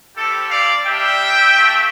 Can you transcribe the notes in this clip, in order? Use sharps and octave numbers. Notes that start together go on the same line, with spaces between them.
G3 C4 E4 G4 A4
D5 F5
G3 D4 G4 E5 G5
A3 D4 F4